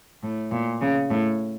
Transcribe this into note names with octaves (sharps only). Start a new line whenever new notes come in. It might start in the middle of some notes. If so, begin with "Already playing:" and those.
A2
A#2
C#3
A2